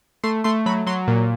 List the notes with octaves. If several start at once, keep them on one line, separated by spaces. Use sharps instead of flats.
A3 C6
A3 C6
F#3 B5
F#3 C6
A#2